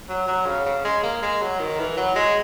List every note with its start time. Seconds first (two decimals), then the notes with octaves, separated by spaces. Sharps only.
0.09 F#3
0.28 F#3
0.47 C#3
0.66 C#3
0.85 G#3
1.03 A#3
1.22 G#3
1.42 F#3
1.59 D#3
1.79 E3
1.97 F#3
2.16 G#3